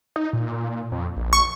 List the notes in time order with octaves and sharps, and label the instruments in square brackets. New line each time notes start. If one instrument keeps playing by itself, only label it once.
[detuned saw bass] D#4
A#2
F2
A#1
[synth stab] C#6